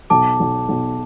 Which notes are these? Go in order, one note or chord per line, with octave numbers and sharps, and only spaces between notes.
B1 A5 D6
B1
B1